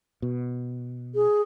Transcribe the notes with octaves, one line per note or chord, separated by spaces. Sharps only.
B2
G#4